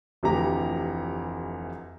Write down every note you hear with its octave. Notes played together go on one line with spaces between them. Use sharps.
F1 D2 E3 G4 A#5